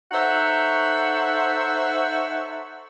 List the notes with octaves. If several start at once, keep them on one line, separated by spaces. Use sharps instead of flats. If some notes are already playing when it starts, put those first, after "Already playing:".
D#4 A4 C5 C#5 E5 F#5